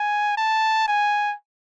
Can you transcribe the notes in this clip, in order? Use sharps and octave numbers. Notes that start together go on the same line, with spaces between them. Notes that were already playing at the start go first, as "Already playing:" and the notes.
Already playing: G#5
A5
G#5